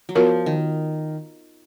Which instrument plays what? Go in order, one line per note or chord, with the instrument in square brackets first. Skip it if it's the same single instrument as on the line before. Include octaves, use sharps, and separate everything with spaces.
[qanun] F#3
[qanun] F3 [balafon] B3 F#4 A#4 C#5
[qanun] D#3